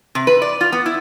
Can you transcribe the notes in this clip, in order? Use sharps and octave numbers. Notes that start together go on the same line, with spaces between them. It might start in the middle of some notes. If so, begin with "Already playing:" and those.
C3
B4
D5
F4
B3
E4